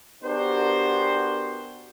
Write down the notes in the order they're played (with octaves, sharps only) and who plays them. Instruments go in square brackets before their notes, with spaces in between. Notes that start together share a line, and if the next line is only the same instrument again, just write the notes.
[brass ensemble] B3 D4 F#4 G4 A#4 C5